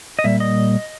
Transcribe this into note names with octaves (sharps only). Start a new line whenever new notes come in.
D#5
A#2 G3 E5
D#5